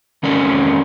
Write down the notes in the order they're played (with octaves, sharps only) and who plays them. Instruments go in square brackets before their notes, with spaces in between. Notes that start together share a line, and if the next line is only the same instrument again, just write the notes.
[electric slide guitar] D#3 G#3 C#4 A4 D5